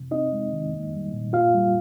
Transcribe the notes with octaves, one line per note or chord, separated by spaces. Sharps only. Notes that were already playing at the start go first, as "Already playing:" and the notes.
Already playing: C3
C4 D#4 D#5
G#3
D#3
A#3
G3
A#2
A#3 F4 F5
G3